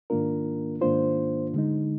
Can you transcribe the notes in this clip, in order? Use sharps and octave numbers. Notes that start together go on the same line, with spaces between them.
G#2 D#3 A#3 D4 F4 A#4
G#2 D#3 A#3 D4 F4 C5
D3 G#3 D#4